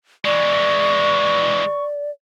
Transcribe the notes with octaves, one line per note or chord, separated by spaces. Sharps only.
E3 G#3 D5 C#6